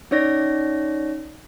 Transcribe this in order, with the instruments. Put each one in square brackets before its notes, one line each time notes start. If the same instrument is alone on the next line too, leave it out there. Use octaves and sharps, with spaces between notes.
[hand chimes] C#4 D#4 C#5 D5 A#6